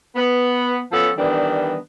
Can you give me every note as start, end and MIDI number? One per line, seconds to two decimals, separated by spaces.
0.16 0.79 59
0.92 1.10 53
0.92 1.10 59
0.92 1.10 61
0.92 1.10 69
1.18 1.76 51
1.18 1.76 52
1.18 1.76 55
1.18 1.76 59
1.18 1.76 62